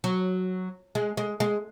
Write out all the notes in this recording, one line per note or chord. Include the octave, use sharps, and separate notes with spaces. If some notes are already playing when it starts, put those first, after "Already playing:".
F#3
G#3
G#3
G#3